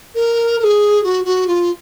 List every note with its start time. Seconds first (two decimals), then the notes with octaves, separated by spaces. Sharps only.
0.15 A#4
0.59 A#4
0.64 G#4
1.04 F#4
1.25 F#4
1.47 F4